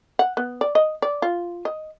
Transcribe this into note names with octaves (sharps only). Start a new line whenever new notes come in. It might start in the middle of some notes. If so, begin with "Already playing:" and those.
F#5
B3
D5
D#5
D5
F4
D#5